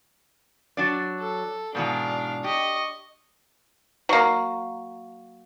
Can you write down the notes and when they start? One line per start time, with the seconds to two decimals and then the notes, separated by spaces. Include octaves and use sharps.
0.77 F#3 D4 D5
1.20 A4
1.75 G#2 B2 E3 D4 F5
2.44 G4 D#5 C#6
4.09 F#3 A#3